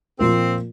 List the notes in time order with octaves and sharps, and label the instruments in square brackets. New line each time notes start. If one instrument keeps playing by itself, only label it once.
[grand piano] A#2 F3 A#3 F4 A#4 [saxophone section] C4